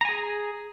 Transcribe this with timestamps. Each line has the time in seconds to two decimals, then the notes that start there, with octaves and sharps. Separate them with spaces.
0.01 A#5
0.05 G#5
0.09 G#4